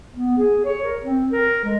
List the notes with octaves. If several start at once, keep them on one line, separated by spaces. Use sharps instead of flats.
B3
G#4
C#5
A#4
C4
A#4
G#3